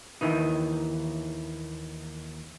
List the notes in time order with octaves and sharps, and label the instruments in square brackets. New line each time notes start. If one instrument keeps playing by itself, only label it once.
[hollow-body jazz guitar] D#2 D#3 E3 D#4